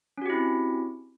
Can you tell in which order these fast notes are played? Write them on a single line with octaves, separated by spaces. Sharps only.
C#4 F#4 G4 E4 C4